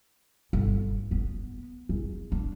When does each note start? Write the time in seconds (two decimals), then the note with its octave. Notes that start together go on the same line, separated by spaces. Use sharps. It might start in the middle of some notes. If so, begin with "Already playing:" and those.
0.53 G1
1.11 B3
1.89 E2
2.32 D4